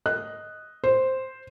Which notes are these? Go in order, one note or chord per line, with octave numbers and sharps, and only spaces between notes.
D#5 F#6
C5